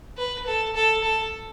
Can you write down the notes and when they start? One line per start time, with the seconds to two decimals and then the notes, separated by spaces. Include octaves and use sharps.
0.18 B4
0.46 A4
0.75 A4
1.04 A4